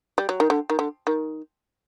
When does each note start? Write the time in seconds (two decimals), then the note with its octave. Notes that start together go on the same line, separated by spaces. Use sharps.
0.18 G3
0.29 F#3
0.40 D#3
0.50 D3
0.70 D#3
0.79 D3
1.07 D#3